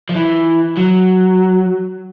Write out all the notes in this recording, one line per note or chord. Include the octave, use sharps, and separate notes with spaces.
F3
E3
F#3